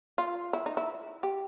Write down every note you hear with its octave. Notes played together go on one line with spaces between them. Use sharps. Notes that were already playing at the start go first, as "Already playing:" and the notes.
F4
E4
D#4
E4
G4